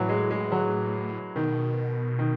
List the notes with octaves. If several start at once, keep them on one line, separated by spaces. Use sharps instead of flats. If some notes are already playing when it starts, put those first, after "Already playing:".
Already playing: A2 E3 F#3
G#3
G#3
F#3
B2 D#3
D#3